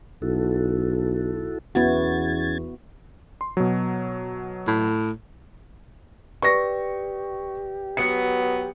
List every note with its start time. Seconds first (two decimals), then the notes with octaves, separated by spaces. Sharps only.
0.22 B1 E4 F#4 A4
1.75 E2 B3 C#4 E4 F#4 G#6 A6
3.41 C6
3.57 B2 F#3
4.67 A2
6.42 G4 B4 D5 C#6 A#6
7.97 F#3 B3 C#7